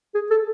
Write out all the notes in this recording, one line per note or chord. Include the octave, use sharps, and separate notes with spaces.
G#4
A4